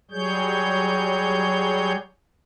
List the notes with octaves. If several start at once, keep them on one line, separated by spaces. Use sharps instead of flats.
F#3 G3 G#4 C#5 G6